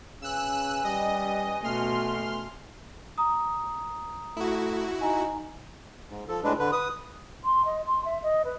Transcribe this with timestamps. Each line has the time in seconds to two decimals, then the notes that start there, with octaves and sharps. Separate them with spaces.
0.22 C#3 C#4 B4 G#5 E6 F#6
0.84 G3 D#5
1.64 B2 A3 C6 F6
3.18 A#5 D#6
4.37 A3 E4 F#4
5.01 D#4 G#5 A#5
6.10 G#2
6.28 F3 A4
6.44 A2 G#3 D4 B4
6.59 D3 B4
6.72 B4 D#6
7.44 C6
7.65 D#5
7.86 C6
8.05 E5
8.22 D#5
8.44 B4